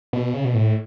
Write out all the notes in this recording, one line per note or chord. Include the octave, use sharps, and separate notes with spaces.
B2
C#3
B2
A2